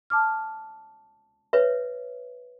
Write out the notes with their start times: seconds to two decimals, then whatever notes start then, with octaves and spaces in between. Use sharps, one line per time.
0.10 A5 D6 F6
1.53 B4 C#5 E5